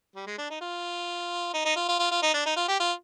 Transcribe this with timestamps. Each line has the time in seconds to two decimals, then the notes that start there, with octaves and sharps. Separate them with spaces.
0.16 G3
0.27 G#3
0.38 D4
0.50 D#4
0.61 F4
1.54 D#4
1.65 D#4
1.76 F4
1.88 F4
1.99 F4
2.11 F4
2.22 D#4
2.34 D4
2.45 D#4
2.56 F4
2.68 G4
2.80 F4